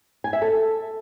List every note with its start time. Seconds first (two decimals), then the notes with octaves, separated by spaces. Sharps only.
0.24 G#5
0.33 E5
0.42 A4